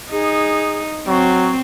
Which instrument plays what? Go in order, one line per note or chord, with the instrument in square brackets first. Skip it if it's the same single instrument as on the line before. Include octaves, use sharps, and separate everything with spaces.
[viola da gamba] D#4 [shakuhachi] G#4
[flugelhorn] F#3 [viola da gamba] C4 [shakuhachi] C#6